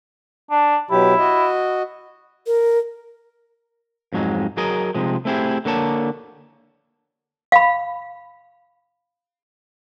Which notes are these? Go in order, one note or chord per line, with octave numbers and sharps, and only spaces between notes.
D4
B2 F#3 E4 G4
F#4 D#5
A#4
F2 G#2 F#3 G#3
F#3 G#4 A#4 D#5
C3 F3 G#3
A3 C4 E4 G4 G#4
D3 A#3 C#5 A5
F5 B5